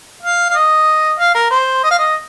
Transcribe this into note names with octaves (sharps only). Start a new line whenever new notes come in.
F5
F5
D#5
F5
A#4
C5
D#5
F5
D#5